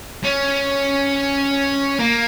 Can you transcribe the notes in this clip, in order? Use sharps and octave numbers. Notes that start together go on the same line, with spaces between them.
C#4
A#3